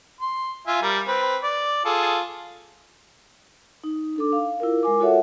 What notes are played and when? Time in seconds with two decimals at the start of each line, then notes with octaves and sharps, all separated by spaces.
0.20 C6
0.67 F4 E5 G#5
0.82 G3 A#4
1.08 C4 B4
1.43 D5
1.85 F4 G#4 A4
3.84 D#4
4.16 D4 A4 D6
4.32 F5
4.60 E4 F4 A#4
4.83 G#3 A#4 G#5 D6
5.00 F4 F#4 A4 C#5 E5 F#5